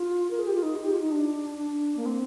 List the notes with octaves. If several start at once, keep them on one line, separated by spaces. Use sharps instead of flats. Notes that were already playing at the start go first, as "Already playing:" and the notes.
Already playing: F4
A#4
G#4
G4
F4
D#4
G#4
G4
F4
D#4
D4
D4
A#3
C4